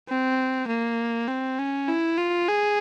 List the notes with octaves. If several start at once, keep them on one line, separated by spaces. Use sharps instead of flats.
C4
A#3
C4
C#4
E4
F4
G#4